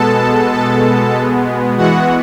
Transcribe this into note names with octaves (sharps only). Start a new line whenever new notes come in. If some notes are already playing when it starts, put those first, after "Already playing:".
Already playing: B2 G#3 B3 A4 A5
A4 A5
E3 G#3 B3 F#4 F#5